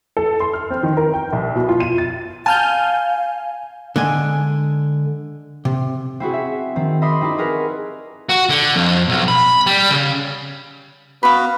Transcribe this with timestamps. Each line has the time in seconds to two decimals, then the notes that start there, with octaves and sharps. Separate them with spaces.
0.17 A4
0.40 C6
0.54 F6
0.70 C4
0.83 D#3
0.97 A#4
1.14 G5
1.33 C2
1.55 B2
1.69 F4
1.80 D#7
1.98 A6
2.46 F5 G#5 A5 F6 G6
3.96 D3 G#3 G#5
5.65 C3
6.20 C4 E4 F#4 G#4
6.34 E5
6.76 D#3 C4
7.02 D#5 E5 B5 C6 D6 D#6
7.21 C4 D#4 E4 G4 D5
7.38 F#4 G#4 A#4 B4
8.29 F#4
8.49 D3
8.76 F2
9.08 B1
9.28 B5
9.66 G3
9.91 C#3
11.23 B3 F#4 B4 F5 B5